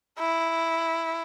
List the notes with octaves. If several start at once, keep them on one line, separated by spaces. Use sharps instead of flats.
E4